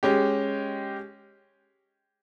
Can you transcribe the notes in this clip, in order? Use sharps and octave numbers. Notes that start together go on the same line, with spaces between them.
G#3 C#4 G4